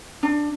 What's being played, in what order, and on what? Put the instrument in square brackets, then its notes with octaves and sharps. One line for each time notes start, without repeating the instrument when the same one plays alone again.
[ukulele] D4